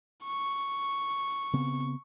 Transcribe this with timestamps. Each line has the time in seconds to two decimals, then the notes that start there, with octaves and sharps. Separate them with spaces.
0.25 C#6
1.53 C#3 B3 C4